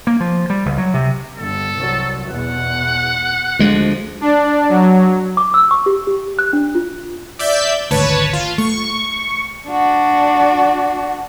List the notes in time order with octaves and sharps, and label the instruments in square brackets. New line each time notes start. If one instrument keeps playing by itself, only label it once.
[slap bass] A#3
F3
G3
C#2
F#3
C3
[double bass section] G1 [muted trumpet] A4
[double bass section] C2 F#3
[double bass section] E2 B2 [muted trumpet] F#5
[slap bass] D2 G#3 [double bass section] F3
[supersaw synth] D4
F#3
[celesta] D6
E6
C#6
G4
G4
F#6
D4
F4
[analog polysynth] D5 E5 G6
[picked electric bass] G#1 D2 [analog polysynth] B4 C#5 A5
[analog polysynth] F4
[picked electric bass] A3 [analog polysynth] C#6
[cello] D4 F#4